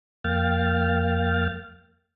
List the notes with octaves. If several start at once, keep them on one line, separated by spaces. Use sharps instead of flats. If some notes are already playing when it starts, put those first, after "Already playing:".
F2 A#3 F5 G5 F6 A6